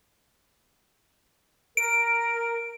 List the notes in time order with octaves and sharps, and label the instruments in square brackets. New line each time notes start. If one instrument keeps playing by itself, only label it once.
[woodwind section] A#4 [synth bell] D7